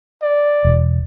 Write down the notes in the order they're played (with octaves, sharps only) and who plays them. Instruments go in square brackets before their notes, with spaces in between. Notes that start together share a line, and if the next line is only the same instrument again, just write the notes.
[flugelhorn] D5
[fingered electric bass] E1